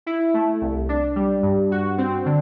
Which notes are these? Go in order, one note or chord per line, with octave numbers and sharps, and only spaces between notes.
E4
A3
C2
D4
G3
G2
F#4
C4
D3